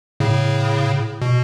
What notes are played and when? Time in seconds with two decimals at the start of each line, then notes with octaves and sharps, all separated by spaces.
0.20 A2 C#3
1.22 B2